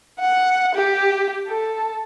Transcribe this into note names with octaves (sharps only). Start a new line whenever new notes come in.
F#5
G4
A4